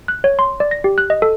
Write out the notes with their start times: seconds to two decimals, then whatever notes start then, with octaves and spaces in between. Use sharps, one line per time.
0.08 F#6
0.24 C#5
0.39 C6
0.60 D5
0.71 A#6
0.84 G4
0.98 F#6
1.10 D#5
1.22 A4